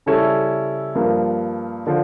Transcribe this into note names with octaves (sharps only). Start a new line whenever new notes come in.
C#3 G3 C#4 E4 A4
G2 F3 A#3
D3 F3